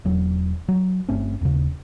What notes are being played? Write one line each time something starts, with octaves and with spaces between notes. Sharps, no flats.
E1 F#3
F#3
G1 A3 C4 C#4
D#1 C#3